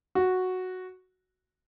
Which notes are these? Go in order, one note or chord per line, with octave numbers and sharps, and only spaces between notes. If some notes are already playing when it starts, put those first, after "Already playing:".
F#4